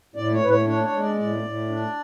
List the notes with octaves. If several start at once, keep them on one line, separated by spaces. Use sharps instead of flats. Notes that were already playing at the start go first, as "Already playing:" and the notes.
A2 D5
C#5
A2 B4
C#5
D4 C#5
C#5
G#3
D5
A2 D5
A2
D4